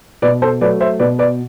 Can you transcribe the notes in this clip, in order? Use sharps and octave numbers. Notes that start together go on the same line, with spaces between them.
B2 B4 D5
A4 C5
F#3 A3 B4 D5
C5 E5
B2 B4 D5
B4 D5